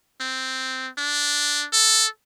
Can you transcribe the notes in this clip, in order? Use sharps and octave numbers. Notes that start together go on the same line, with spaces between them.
C4
D4
A4